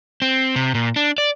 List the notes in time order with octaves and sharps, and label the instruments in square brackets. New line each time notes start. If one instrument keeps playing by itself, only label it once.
[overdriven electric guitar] C4
C3
A#2
D4
D5